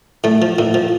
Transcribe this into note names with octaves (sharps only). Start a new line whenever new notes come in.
A2 A3
F3
A2 A#3
F3